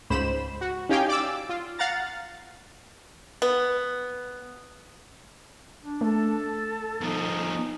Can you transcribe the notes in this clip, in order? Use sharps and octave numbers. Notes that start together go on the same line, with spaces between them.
C#2 G#2 C5 B5 E7
F#4
C#4 D#4 G4 F5 G5 G#5
D5 D6 E6
F4
F5 F#5 A#5 A6
B3
D4
A3 A4
B2 F3 D#4